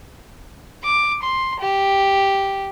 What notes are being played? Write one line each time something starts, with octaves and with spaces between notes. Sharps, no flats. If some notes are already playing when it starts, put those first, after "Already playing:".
D6
C6
G4